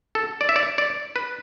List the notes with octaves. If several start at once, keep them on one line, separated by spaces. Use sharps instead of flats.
A4
D5
E5
D5
D5
B4